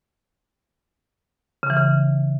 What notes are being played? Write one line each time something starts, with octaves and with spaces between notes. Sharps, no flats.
C#3
E3
C#3